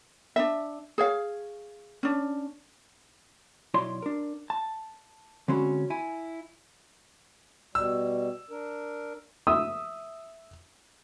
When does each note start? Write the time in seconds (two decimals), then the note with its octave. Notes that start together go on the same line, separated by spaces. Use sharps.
0.36 D4 D#4 E5
0.98 G#4 C#5 F5
2.03 C#4 D4
3.74 B1 E4 C#5 D5 C6
4.02 D4 A#4
4.50 A5
5.48 D3 G#3 C4 C#4 F#4 B5
5.90 E4 G#5
7.75 B2 G3 E6
8.51 D4 A#4
9.47 E5 D#6 E6